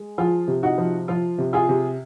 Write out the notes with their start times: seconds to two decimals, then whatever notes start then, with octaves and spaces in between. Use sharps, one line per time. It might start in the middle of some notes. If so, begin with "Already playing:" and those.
Already playing: G#3
0.18 F3 F4 G#4
0.48 C3
0.63 D#4 F#4
0.78 F3
1.08 F3 F4
1.38 C3
1.53 F4 G#4
1.69 C3